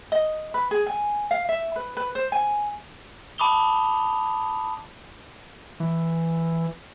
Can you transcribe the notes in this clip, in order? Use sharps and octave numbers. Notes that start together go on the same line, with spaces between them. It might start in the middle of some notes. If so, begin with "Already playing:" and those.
D#5
B4
G#4
G#5
F5
E5
B4
B4
C5
G#5
A5 B5 D6 D#6 F7 G7
E3